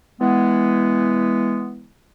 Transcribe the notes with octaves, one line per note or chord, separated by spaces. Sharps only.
E3 G#3 B3